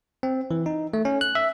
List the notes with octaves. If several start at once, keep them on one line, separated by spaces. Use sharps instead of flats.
C4
E3
D#4
A3
C#4
F#6
E5